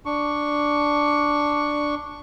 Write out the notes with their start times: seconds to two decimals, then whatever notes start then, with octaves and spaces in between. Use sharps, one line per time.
0.05 D4 C#6